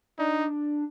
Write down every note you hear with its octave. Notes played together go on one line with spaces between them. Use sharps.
D4 D#4